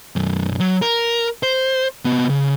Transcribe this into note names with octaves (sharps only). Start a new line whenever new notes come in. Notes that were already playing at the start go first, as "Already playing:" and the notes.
B1 F#2
F#3
A#4
C5
C3 B3
C#3